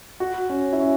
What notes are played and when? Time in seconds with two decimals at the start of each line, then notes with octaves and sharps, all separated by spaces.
0.20 F#4
0.50 C#4
0.73 E4
0.80 C#4